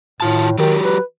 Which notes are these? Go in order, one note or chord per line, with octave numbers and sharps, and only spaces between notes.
A2 D#3 F4 A5
D#3 F#3 G4
B4